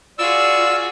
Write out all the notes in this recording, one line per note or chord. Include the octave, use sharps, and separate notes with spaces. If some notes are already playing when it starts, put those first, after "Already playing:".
F4 F#4 G#4 D5 E6